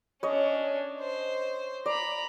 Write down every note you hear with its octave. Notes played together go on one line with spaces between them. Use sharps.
C#4 D4 C#5 D#5
C5
D5 A#5 B5